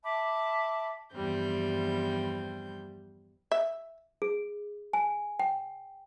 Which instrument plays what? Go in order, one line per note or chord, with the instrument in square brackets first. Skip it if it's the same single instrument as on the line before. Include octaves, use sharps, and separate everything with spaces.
[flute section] E5 A5 B5 D6
[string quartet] E2 G2 F3 G3 C4 G6
[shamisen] E5
[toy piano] G#4
G#5
G5